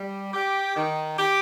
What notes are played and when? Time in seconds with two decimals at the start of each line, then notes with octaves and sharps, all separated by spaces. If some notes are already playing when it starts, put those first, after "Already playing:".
Already playing: G3
0.34 G4
0.76 D#3
1.18 G4